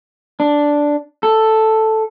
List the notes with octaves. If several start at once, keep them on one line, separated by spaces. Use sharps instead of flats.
D4
A4